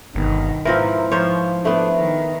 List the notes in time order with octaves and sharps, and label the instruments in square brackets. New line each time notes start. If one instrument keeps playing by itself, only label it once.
[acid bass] G1 [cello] B2 D#3
[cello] G#2 [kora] E3 F3 C4 [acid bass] A#4
[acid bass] F3 [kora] C5 C#5
[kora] A3 B3 [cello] D4
[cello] D#3